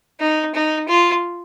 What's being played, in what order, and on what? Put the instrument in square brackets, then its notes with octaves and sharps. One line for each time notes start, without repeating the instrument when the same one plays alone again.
[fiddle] D#4
D#4
F4